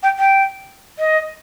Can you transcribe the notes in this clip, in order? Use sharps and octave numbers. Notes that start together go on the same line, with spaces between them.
G5
G5
D#5